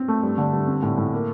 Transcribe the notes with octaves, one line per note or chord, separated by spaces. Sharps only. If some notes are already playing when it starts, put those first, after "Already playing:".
Already playing: C4
A3
G2
D3
G2
C4
A2
A2
A#3